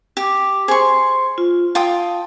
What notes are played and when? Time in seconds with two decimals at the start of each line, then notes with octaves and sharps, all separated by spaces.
0.17 G4
0.68 G#4 C5 C6 C#6
1.38 F4
1.75 F4 G5 A5 D#6